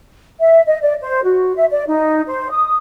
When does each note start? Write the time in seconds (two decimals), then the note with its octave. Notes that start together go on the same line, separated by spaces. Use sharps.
0.40 E5
0.67 D#5
0.81 D5
1.01 C5
1.23 F#4
1.56 E5
1.71 D5
1.88 D#4
2.28 C5
2.51 D#6